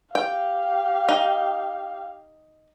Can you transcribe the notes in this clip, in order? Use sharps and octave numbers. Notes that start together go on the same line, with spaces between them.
G4 F5 G5
D#4